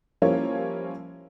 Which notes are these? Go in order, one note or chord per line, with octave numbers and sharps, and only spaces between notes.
F3 G3 A#3 C#4 E4 C#5